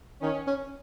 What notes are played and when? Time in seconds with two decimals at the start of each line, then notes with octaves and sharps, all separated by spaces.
0.22 D#3 C#4
0.47 C#4